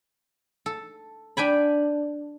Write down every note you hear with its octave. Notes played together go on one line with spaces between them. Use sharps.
A4
D4 G5 G#5 B5